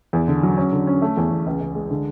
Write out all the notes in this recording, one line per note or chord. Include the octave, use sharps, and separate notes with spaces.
E2
D3
F#3
C#4
D3
C#4
A3
E2
E2
C#2
C#2
G#3
D3